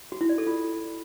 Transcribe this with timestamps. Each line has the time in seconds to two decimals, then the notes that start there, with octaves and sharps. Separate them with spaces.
0.12 F#4
0.21 E4
0.29 D5
0.38 A4
0.47 F4